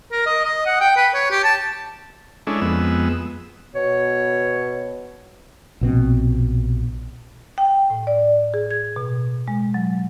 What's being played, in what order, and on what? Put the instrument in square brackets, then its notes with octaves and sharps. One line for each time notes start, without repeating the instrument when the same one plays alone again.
[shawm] A#4
D#5
D#5
F#5
G5
B4
C#5
G4
A5
[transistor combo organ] G#3 C#4 D4 E4 A4
F2 G#3 B3 E6
[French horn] B2 [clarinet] C#5
[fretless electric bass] A#1 B2 C4
[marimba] G5
A2
D5
G#4
G#6
B2
G#3
F#3